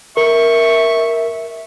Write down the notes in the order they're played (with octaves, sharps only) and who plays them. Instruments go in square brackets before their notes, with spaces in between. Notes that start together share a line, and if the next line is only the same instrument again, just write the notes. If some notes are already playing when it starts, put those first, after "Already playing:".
[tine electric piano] A#4 [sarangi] E5 [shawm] C#6